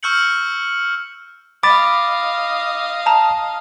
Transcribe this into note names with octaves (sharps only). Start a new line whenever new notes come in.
C#6 E6 F6 G6 C#7 F#7
D#5 F5 B5 D6 A6
A5 A#5